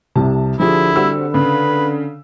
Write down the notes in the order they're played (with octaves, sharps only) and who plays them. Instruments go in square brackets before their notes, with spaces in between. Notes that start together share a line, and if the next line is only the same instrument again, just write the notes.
[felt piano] C2 C3 [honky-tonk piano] A5
[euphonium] D3 [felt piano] F3 G4 G#4 [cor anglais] E4
[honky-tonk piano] G3 C4 F#4 [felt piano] E6
[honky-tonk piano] C#3 [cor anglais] B4